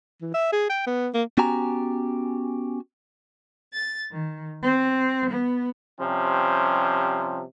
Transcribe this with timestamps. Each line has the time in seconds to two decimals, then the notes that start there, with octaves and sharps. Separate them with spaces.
0.22 E3
0.34 E5
0.52 G#4
0.70 G5
0.86 B3
1.14 A#3
1.38 B3 C#4 F#4 G4 G#5 A#5
3.73 A6
4.11 D#3
4.62 C4
5.30 B3
6.00 C3 F3 G3 C#4